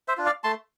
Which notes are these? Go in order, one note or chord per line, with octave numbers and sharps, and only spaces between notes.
C5 E5
D4 F4
D5 F5
A3 A5 C6